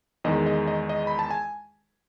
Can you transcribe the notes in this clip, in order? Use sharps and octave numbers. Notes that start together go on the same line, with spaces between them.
E2 D#3 G#3 D#5
D#5
D#5
D#5
B5
A5
G#5